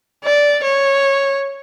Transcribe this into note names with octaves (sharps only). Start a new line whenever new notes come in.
D5
C#5